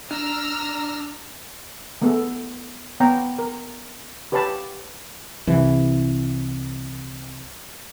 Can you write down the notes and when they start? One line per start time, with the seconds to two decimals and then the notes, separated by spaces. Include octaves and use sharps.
0.11 D4 A#5 E6 F6
2.02 A3 B3 F#4 G#4 A4
3.00 B3 C#5 G5 A#5
3.39 A#4
4.32 G4 B4 C#5 F5 A5 B5
5.47 C2 E3